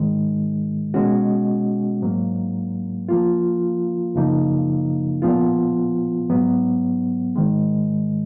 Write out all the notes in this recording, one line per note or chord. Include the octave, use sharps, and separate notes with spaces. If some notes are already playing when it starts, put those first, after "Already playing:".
Already playing: G#2 D#3 G#3
B2 G#3 C#4 F#4
G#2 F#3 A#3
F3 A#3 F4
F#2 C#3 F3 A#3 D#4
A#2 F3 B3 F4
G#2 F#3 B3
G#2 D#3 G#3